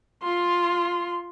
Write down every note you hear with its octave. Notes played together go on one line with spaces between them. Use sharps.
F4 C6